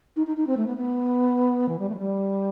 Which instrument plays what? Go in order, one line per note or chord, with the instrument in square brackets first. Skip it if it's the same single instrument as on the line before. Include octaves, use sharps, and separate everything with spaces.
[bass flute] D#4
D#4
D#4
C4
A3
B3
B3
E3
G3
A3
F#3
G3